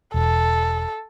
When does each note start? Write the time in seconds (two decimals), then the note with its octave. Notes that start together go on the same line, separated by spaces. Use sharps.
0.14 E1 A4